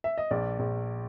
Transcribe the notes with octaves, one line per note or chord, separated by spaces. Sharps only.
E5
D#5
A#1 D5
A#1